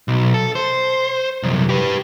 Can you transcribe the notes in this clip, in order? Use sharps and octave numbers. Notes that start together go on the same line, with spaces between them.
B1
A4
C5
C2 F#2
G4 B4